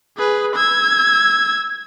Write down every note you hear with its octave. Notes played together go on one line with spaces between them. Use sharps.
G#4 B4
E6 G#6